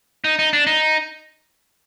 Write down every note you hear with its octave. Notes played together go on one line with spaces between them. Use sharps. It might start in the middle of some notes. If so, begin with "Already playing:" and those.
D#4
D#4
D4
D#4